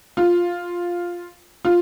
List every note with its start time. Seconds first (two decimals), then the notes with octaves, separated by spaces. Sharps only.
0.17 F4
1.65 F4